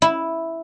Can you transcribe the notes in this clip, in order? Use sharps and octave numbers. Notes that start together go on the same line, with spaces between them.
E4